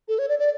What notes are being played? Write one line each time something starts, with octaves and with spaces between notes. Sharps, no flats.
A4
C#5
D5
D5